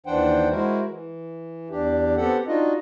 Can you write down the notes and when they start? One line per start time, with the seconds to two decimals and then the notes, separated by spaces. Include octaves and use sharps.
0.06 D#2 E3 D4 C5 F#5 G5
0.51 G#3 E4 F#4 A#4 C5
0.89 E3
1.70 E2 D4 G4
2.17 B3 C4 G4 A4 F#5
2.47 D4 D#4 F4 F#4 D#5